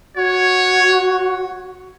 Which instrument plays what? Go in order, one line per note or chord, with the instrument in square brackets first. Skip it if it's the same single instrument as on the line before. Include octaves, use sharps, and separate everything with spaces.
[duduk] F#4 [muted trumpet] C#5